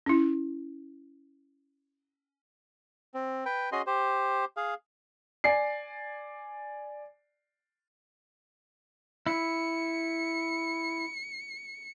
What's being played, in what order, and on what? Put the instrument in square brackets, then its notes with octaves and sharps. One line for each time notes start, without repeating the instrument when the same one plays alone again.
[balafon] C#4 E4
[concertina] C4
B4 G5
C#4 F#4 G#4 D#5 C6
G4 C5
G#4 F5
[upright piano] D5 G#5 C7
[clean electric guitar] E4 [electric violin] C#7